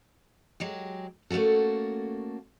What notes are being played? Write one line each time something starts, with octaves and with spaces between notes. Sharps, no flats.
F#3 G#3 G4
A3 A#3 C#4 F#4 A4